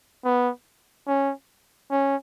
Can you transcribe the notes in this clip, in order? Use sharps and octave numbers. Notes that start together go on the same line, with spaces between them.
B3
C#4
C#4